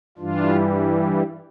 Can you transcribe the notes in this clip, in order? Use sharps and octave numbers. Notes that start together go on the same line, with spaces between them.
G2 E3 G3 D4 F4